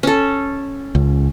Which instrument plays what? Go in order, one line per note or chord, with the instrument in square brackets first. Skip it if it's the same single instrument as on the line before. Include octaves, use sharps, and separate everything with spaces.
[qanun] C#4 A4
[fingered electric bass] C#2